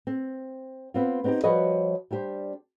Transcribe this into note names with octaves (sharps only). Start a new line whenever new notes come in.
C4
B3 C4 F4
B3 C4 D#4 F#4 G4
F3 G3 F#4 B4 C#5 D#5
G3 D4 G4 C5